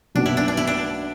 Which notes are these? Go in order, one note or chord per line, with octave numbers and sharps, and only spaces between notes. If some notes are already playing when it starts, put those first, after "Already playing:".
B1 B2 A#3 D4
E4
D4
D4
E4
D4